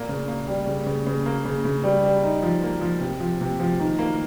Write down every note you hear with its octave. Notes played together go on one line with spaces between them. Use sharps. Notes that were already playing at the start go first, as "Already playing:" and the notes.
Already playing: A#2 A#3
C#3
A#3
G3
C#3
C#3
C#3
A#3
C#3
C#3
G3
G3
D#4
F3
A#3
F3
C3
F3
C3
F3
D#3
A#3